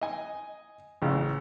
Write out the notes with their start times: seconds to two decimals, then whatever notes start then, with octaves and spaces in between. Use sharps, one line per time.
0.01 D#5 G#5
1.02 A1 C#3